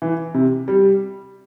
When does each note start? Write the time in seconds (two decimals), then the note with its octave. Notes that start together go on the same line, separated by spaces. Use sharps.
0.02 E3
0.34 C3
0.68 G3